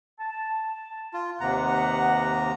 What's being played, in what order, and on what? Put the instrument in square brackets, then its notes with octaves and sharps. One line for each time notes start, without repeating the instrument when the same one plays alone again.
[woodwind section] A5
[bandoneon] F4
[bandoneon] D#2 C3 A#5 [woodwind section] B4 D#5 F#5